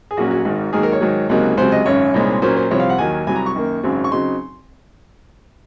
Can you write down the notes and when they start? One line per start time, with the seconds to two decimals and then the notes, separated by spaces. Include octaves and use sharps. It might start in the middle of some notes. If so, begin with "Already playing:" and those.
0.11 G#4
0.17 A#1 A#2 F#3 C#4 F#4
0.31 F#4
0.45 G#1 G#2 D#3
0.73 G#2 D#3 F#3 A#3 G#4
0.83 A#4
0.93 C#5
1.01 G#2 D#3 F#3
1.29 C#2 C3 F#3 A#3 D#4
1.57 C#2 C3 F#3 C5
1.72 D#5
1.86 G#1 F#2 C#3 C#5
2.14 C2 A#2 G#3 C4 D#4
2.42 A#2 F#3 A#3 C#4 C5
2.56 C5
2.71 C2 C3 F3 C#5
2.80 F5
2.90 F#5
2.98 D#2 D#3 F#3 G#5
3.27 C2 C3 F#3 G#5
3.36 A#5
3.46 C#6
3.54 F#2 D#3 A#3 D#4
3.83 G#1 F#2 C#3 F#3 C4
4.04 C#6
4.11 C#3 F#3 C4 D#4 C6